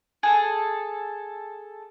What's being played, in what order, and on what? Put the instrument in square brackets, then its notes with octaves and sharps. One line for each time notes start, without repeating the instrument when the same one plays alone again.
[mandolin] G#4 A4